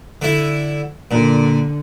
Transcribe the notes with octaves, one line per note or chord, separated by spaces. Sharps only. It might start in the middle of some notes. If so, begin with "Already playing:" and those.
D3 E4
A#2 D3